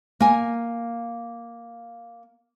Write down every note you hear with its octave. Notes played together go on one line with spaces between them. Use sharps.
A#3 G#5